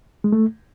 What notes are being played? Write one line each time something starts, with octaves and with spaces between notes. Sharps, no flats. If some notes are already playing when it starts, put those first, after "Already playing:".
G#3
A3